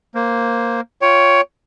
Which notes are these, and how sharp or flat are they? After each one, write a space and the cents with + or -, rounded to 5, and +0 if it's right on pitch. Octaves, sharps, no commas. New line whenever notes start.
A#3 +0 C5 +0
F4 +0 C#5 +10 G5 +0